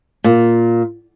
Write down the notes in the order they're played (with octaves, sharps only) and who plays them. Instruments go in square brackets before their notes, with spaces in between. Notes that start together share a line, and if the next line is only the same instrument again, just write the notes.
[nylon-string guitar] A#2